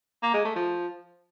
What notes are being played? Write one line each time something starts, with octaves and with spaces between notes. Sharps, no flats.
A#3
G#3
A3
F3